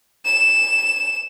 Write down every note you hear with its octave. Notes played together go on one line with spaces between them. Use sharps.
E7